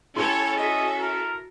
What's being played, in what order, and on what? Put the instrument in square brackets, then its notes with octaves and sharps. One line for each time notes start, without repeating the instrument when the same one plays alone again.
[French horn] C#4 [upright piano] E4 C6 [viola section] G4 A4 C#5
[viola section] F#4 A4 E5 [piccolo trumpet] D#5
[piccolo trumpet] A#4